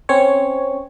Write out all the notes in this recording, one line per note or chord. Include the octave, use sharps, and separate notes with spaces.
C4 C#4 C#5